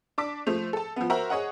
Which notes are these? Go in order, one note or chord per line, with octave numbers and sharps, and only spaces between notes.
D4 A5 D6 B6
F3 A3 C5 F7
A4 A5
F3 B3
F#4 A#4 C5 E5 A#5
G#4 C#5 D#5 F#5